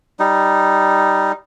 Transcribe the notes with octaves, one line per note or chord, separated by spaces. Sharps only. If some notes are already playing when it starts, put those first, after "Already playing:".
G3 D#4